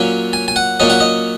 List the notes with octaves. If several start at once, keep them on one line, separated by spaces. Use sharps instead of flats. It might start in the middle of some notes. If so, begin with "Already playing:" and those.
Already playing: A#2 F#3 C#4
G#5
G#5
F#5
A#2 F#3 C#4 D#5
F#5
D#5